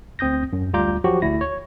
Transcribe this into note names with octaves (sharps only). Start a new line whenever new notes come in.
D2 C4 D#6 G6 A#6
F#2
D2 G3 F4 A#5 D6 G6
F3 F#3 F#4 G4
D2 E4 A#6
C#5